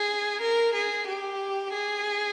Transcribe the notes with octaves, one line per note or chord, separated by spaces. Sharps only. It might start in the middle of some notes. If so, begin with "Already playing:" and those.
Already playing: G#4
A#4
G#4
G4
G#4